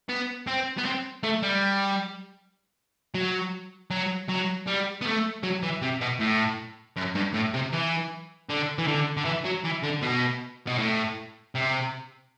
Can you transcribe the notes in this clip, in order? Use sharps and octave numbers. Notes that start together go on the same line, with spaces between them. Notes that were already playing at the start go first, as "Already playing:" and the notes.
B3
C4
B3
C4
A3
G3
F#3
F#3
F#3
G3
B3
A3
F#3
E3
C3
B2
A2
F#2
G2
A2
C3
E3
D3
E3
D3
D3
E3
F#3
E3
D3
B2
B2
A2
C3